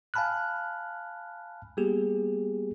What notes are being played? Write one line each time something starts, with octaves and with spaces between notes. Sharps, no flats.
F5 G#5 A5 B5 F6 F#6
G3 A#3 B3 G4 G#4